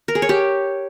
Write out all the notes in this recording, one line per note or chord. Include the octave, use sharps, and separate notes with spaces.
A#4
G#4
C#5
G4